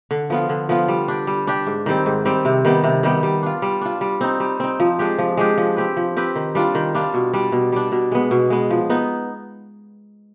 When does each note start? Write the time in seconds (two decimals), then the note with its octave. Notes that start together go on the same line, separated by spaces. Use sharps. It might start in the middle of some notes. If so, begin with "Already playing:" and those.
0.11 D3
0.30 F3 B3 F4
0.49 D3
0.69 F3 B3 F4
0.88 G3
1.08 D4 G4
1.27 G3
1.47 D4 G4
1.67 G#2
1.86 D#3 G3 C4
2.06 G#2
2.25 D#3 G3 C4
2.45 C3
2.65 D#3 G3 B3
2.84 C3
3.03 D#3 G3 B3
3.23 G3
3.43 D4 F4
3.62 G3
3.81 D4 F4
4.01 G3
4.21 C4 D#4
4.40 G3
4.60 C4 D#4
4.80 F3
4.99 G#3 D4 G4
5.19 F3
5.37 G#3 D4 G4
5.58 F3
5.77 C4 G4 B4
5.97 F3
6.17 C4 G4 B4
6.36 D#3
6.55 G3 D4 F4
6.75 D#3
6.95 G3 D4 F4
7.14 B2
7.34 G3 D4
7.52 B2
7.72 G3 D4
7.92 B2
8.12 G#3 B3
8.31 B2
8.50 G#3 B3
8.70 F3
8.90 B3 D#4